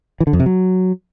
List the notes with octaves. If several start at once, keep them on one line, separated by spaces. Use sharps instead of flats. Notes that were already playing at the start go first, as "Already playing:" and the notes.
E3
D3
F2
C3
F#3